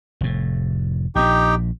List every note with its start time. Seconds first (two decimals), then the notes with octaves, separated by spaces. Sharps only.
0.21 F1 A2
1.15 A#1 A#2 D#4 G4 G5